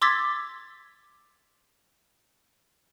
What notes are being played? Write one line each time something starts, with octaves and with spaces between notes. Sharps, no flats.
C6 D6 E6 G#6 A6 B6